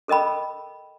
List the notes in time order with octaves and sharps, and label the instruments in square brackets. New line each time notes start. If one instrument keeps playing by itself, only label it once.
[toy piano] A4 A#4 D#5 G5 B5